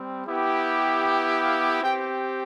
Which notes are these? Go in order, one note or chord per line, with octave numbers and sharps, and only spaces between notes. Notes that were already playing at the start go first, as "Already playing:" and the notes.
Already playing: G3 C4
B3 E4 G4
G5
F5
C4 G4 G5